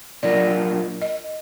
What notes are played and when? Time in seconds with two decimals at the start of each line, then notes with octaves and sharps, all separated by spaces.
0.23 A#2 F#3 D4 F4 A#4 D5
1.02 D#5